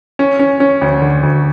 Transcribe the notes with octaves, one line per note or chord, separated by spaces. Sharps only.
C#4
C#4
C#4
D2
D3
D2